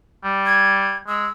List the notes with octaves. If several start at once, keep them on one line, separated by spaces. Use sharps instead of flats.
G3
G#6
G#3 E6